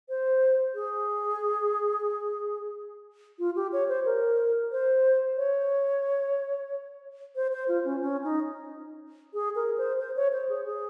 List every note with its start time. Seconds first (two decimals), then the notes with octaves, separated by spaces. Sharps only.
0.09 C5
0.75 G#4
3.39 F4
3.56 G4
3.73 C#5
3.88 C5
4.05 A#4
4.72 C5
5.37 C#5
7.36 C5
7.52 C5
7.68 F4
7.85 C#4
8.01 C#4
8.24 D#4
9.34 G#4
9.55 A#4
9.78 C5
10.00 C5
10.16 C#5
10.32 C5
10.49 G#4
10.66 G#4